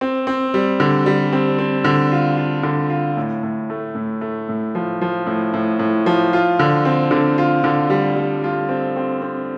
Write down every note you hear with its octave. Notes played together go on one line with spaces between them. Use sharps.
C4
C4
G3
D3
G3
C4
C4
D3
F4
F4
D3
F4
A2
A2
A3
A2
A3
A2
F3
F3
A2
A2
A2
F3
F4
D3
C4
D3
F4
D3
G3
G3
F4
C4
C4
C4